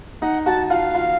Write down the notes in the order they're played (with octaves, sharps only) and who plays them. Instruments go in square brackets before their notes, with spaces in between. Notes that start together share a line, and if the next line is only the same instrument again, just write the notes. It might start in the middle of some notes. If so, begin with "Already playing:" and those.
[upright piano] D#4 [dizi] F#5
[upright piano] F#4 [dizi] A5
[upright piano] F4 [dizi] F#5
[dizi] F5
[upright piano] F4